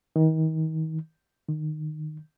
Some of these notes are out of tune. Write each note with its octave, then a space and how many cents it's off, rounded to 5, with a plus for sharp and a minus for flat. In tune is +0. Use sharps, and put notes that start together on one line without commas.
D#3 +35
D#3 -20